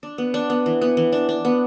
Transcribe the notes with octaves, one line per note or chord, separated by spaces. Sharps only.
D4
B3
D4
B3
E3
B3
E3
D4
D4
B3